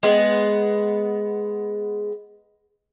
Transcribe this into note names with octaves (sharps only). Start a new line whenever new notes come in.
G#3 B3